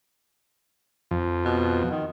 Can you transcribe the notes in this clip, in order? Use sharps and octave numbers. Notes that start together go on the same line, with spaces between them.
F2
B2
D#3